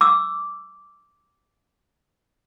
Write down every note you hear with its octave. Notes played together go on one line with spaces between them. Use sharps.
D6 E6